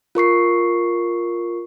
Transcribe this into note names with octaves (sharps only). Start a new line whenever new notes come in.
F4 A#4 C#6 C7